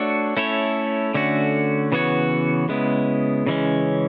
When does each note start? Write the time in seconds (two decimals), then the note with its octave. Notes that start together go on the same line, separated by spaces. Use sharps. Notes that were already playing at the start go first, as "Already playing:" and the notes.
Already playing: A3 D4 F#4 A4 C#5
0.37 A3 C#4 E4 A4 C#5
1.14 D3 A3 C#4 F#4
1.92 C#3 E3 B3 F#4 C#5
2.69 C#3 G#3 B3 E4
3.46 C#3 E3 G#3 C#4